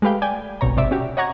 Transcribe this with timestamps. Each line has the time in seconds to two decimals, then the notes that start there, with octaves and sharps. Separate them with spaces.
0.02 G#3 A3 G4 B4 F5 G5
0.22 D5 G5 G#5
0.61 G1 C2 B2 C#5 A#5
0.76 G#1 C3 C5 D5 E5
0.91 C#4 F#4 G4
1.17 C#5 D#5 F#5 A#5 C#6 G#6